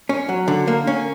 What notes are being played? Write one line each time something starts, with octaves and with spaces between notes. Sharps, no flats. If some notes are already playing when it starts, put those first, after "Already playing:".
C#4
F#3
D3
A#3
C#4